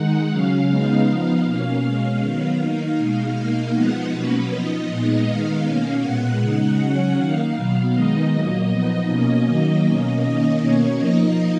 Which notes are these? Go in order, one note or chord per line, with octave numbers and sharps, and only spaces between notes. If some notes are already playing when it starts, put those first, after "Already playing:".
Already playing: D#3 G#3 D#4 F#5
C#3 F#3 C#4 F5
C#3 G#3 B3 D#4 F5
F3 B3 D#4 F5
B2 A#3 C#4 F5
B2 G#3 C#4 F5
D#3 F#3 B3
D#3 A#3 D#4 F5
B2 G#3 D#4
B2 A#3 D#4 F5
F3 G#3 B3 D#4 F#5
B2 F#3 A#3 C#4 B4
F3 B3 D#4 D#5
A#2 G#3 B3 D#4
D#3 G#3 B3 D#4 F5
B2 A#3 C#4 F5
A#2 G#3 B3 F#5
C#3 G#3 D#4
C#3 F#3 C#4
D#3 A#3 D#4 F5
B2 F#3 B3
D#3 G#3 B3 D#4 D#5
A#2 F#3 A#3
F3 B3 D#4
B2 A#3 C#4
D#3 F#3 A#3 D#4 D#5
B2 A#3 C#4
D#3 A#3 C#4 D#5
B2 A#3 C#4 C#5
F3 A#3 D#4 D#5